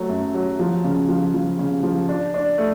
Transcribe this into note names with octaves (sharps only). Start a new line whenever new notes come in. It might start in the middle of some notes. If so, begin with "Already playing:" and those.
Already playing: F#3 A3
F#2
F#3
F3
C#3
F3
F3
C#3
F3
D4
D4
A3